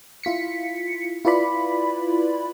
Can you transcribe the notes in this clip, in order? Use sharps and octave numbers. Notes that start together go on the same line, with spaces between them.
E4 F4 B6 C#7
E4 F4 B4 D5 B5